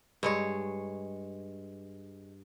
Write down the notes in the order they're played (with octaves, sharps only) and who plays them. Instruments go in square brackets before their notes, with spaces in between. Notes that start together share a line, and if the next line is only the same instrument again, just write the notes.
[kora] G2 G#3 C#5